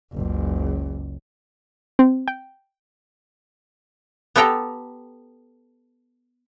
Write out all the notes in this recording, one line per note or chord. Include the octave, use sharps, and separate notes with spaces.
F#1 C#2
C4
G5
B3 G4 A4 G5 A#5